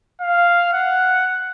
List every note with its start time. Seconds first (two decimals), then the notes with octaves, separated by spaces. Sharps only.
0.21 F5
0.73 F#5